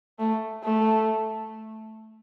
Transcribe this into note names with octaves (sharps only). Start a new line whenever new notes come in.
A3
A3